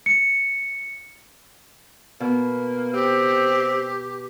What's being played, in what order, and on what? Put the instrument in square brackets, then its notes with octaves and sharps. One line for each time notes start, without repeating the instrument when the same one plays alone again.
[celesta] C#7
[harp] B2 [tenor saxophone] A#3
[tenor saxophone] C4 [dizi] G4